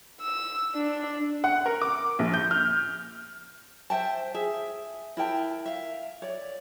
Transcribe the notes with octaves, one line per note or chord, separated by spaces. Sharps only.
E6
D4
F#5
A#4
D6
A#1
G6
F6
C5 E5 G5 A5
G#4 E5
E4 A#4 G5 A5
E5 F5
C#5 D5